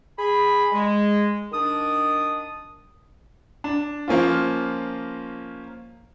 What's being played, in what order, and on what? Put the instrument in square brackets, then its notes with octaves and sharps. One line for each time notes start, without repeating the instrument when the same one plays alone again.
[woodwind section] G#4 B5
G#3
D#3 D4 D#6
[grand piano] D4
F3 A#3 C#4 F4